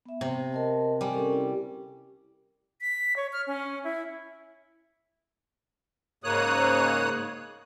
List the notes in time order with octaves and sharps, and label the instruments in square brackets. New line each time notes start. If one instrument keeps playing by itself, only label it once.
[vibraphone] B3 E5
[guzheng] C3
[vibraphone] A#4 D#5 A5
[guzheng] G3 [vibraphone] G#5
[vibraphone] C#4 A4 A#4
E4
[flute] B6
C#5
F6
C#4
E4
[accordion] G#2 C#3 A#3 C#5 D#6 F#6